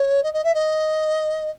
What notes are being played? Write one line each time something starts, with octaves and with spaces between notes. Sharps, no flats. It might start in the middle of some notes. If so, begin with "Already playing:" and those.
Already playing: C#5
D#5
D#5
E5
D#5